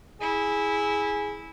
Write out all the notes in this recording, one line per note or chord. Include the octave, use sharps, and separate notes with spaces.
E4 G#4